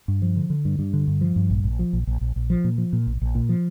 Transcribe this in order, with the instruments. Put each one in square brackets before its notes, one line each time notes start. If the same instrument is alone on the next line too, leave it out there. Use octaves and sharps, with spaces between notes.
[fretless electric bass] G2
F3
D3
D3
G2
G2
D3
G2
F3
G2
A#1
A#1
F3
A#1
A#1
A#1
A#1
F3
A#2
F3
A#2
A#1
A#1
A#2
F3